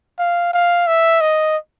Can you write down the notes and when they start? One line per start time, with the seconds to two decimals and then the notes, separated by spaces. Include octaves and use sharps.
0.19 F5
0.54 F5
0.87 E5
1.21 D#5